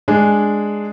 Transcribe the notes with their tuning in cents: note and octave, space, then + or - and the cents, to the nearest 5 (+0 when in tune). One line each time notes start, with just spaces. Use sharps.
G#3 +0 D4 +0 G#4 +0